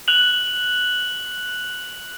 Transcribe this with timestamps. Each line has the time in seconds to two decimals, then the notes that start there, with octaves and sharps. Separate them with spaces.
0.08 F#6 F7 F#7